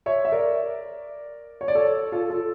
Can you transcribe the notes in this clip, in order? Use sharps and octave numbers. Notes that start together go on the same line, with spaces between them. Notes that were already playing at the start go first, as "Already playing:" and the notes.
C#5 E5
E5
A#4 D5
C#5
D5
A4 C#5
F4 A4
F4 A4